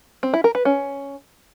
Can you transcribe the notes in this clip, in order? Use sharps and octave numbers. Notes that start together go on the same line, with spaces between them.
C4
E4
A#4
B4
C#4